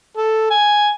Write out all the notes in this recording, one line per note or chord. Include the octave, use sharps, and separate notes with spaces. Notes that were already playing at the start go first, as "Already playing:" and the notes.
A4
G#5